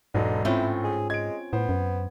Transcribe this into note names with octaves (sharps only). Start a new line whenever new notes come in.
E1 G#2 D3 F#3 D#4
A2 A3 C4 C#4 E4 F4
G#4
G#3 G#6 D7
A2 B3 C5
F#2